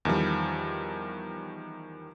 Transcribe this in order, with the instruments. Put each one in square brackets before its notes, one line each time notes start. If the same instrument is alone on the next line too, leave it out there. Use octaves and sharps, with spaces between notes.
[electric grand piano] E2 D#3 F3 G3